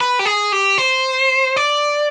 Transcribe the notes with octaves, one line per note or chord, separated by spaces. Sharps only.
B4
G4
G#4
G4
C5
D5